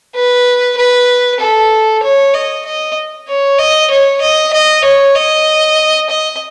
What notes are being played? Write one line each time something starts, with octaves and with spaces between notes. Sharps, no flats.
B4
B4
A4
C#5
D#5
D#5
C#5
D#5
C#5
D#5
D#5
C#5
D#5
D#5